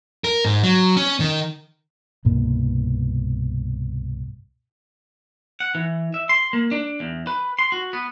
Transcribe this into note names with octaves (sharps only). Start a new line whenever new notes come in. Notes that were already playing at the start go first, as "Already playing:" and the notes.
A#4
G#2
F#3
C#4
D#3
C2 G2 B2 A#3
F#5
E3
E5
C6
A#3
D4
E2
B4
C6
F#4
B3